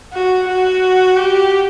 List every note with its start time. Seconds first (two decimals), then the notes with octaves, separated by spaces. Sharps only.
0.13 F#4
0.48 F#4
1.17 G4